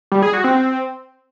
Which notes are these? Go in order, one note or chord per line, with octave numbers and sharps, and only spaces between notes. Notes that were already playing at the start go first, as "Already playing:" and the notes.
G3
G#4
F#4
C4